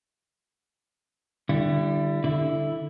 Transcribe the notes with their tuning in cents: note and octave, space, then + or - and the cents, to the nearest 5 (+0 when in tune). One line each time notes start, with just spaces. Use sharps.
D3 +25 G3 +0 E4 +35
D3 +0 E4 +0